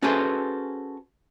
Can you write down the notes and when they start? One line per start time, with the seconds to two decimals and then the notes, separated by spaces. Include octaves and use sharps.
0.02 C#4 F#4 G#4 A4 B4 C5